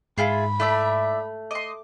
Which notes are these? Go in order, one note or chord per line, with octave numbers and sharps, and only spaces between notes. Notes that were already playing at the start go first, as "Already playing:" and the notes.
G#2 E4 F4 G#4 B5
A3 E4 D5 E5
D#5 C6 D6